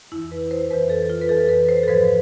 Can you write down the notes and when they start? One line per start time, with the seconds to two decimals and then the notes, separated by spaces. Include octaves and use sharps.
0.12 F2 E3 E4
0.31 B4
0.51 C5
0.71 F2 B4
0.74 E3
0.90 A4
1.10 F4
1.21 B4
1.29 F2 E3 A4
1.49 B4
1.69 C5
1.83 A4
1.87 G#2 F3 B4